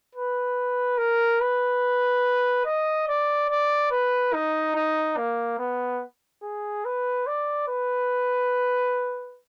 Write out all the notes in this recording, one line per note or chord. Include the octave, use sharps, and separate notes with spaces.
B4
A#4
B4
D#5
D5
D5
B4
D#4
D#4
A#3
B3
G#4
B4
D5
B4